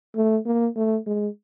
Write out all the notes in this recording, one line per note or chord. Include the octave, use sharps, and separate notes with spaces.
A3
A#3
A3
G#3